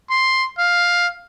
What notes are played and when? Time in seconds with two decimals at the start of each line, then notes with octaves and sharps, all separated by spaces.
0.10 C6
0.59 F5